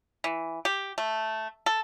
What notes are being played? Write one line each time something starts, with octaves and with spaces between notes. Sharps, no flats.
E3
G4
A3
A4